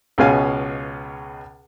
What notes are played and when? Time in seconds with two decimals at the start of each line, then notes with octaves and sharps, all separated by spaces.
0.18 C#2 B2 G#3 C#4 F5 G#5